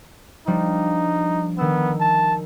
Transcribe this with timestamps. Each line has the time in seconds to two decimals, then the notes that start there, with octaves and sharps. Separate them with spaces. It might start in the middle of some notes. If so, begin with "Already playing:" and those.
0.47 F3 G3 D4 D#4
1.58 D#3 B3 E6
2.00 A5